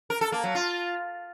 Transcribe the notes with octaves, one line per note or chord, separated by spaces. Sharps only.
A#4
A4
A#3
F#3
F4